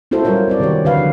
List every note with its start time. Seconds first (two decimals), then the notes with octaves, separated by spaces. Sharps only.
0.11 C#4 E4 F#4 A4 C5
0.25 F#3 G3 E4 F4 A#4 C#5
0.48 C4 C5 D5
0.60 C3 D#3 F#4 G4 C#5
0.85 D3 F#4 B4 F5
0.98 F3